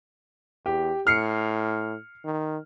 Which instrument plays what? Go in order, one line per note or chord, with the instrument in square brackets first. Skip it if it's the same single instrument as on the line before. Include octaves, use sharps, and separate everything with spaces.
[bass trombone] E2 [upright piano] G4
[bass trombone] A2 [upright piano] F6 C7 C#7
[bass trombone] D#3